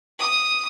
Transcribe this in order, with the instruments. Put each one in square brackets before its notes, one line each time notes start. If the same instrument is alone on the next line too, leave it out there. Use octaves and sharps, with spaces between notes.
[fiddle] D#6